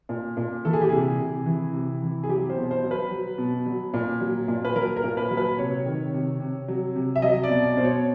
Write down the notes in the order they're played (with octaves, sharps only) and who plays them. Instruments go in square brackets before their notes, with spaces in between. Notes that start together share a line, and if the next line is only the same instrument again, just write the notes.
[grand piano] A#2
A#2
E3 A4
G#4
G4
C3 G#4
C3
E3
C3
E3
G#4
F#3 G4
C5
B2
C5
F#3
B4
F#3
B2
F#3
A#2
F#3
A#2
B4
F#3 A#4
A#4
A#2
B4
F#3
B4
C3 C#5
D#3
C3
C3
F#3
C3
E5
F#3 D#5
D5
B2
D5
B2 C5
C#5